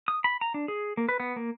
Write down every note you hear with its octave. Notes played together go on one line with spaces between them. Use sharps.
D#6
B5
A#5
D4
G#4
A#3
B4
B3
A#3